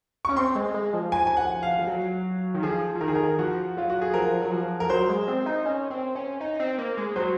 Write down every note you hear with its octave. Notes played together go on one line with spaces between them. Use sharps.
C#4 C#6
C4 C6
G#3
G#3
F3
G#5
G#5
F#5
F5
F3
F#3
D#3
F3 G#4
F3
D#3 A#4
G#4
A#4
F3 F#4
F#3 F4
F#4
G#4
F3 A#4
F#3
F3
A#4
F#3 C5
G#3
C4
D#4
C#4
C4
C#4
D#4
C4
A#3
G#3
F#3 C5